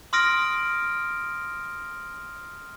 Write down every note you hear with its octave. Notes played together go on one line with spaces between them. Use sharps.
C6 D#6 F6 A#6 D7